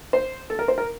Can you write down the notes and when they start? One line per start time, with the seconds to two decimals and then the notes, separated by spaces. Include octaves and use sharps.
0.13 C5
0.50 A4
0.59 A#4
0.68 C5
0.78 A#4